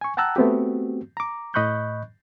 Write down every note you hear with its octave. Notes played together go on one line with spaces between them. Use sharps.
G#5 C#6
F#5 G5 A5 A#5 E6 F#6
A3 B3 C4 F#4 G4
A#5 D6
A2 D#5 B5 C#6 F#6 G6